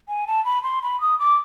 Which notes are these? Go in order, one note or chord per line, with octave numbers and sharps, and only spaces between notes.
G#5
A5
B5
C6
B5
D#6
D6